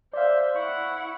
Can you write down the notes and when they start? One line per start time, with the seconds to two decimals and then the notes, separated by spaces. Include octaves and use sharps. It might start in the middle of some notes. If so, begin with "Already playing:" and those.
0.13 C5 D5 E5 F5
0.56 E4 F#5 C#6